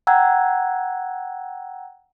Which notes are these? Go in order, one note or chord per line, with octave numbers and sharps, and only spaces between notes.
F#5 G5 A#5 E6 F#6 G#6